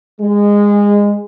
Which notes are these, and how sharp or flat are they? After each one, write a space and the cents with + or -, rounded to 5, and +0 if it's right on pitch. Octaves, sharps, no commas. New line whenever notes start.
G#3 -20